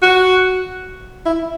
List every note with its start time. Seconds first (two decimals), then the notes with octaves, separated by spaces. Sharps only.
0.02 F#4
1.26 E4